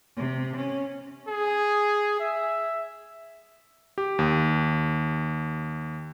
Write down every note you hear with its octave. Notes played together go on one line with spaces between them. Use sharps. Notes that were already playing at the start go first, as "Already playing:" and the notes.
C3
C#4
G#4
E5
G4
D#2